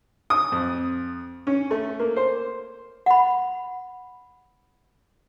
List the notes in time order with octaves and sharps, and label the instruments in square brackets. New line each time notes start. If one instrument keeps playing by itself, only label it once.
[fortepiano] D#6
F2
C#4
A3
A#3
C5
[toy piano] F#5 B5